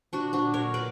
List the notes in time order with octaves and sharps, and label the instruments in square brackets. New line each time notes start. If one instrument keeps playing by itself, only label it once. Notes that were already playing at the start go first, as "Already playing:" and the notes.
[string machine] A#2 F#3 A#3 [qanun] D4 F#4
[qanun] D4 F#4
A#4 C#5
B4 D5